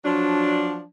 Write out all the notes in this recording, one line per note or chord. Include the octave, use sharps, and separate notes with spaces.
F3 F#3 D4